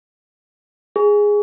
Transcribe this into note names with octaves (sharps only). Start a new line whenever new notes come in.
G#4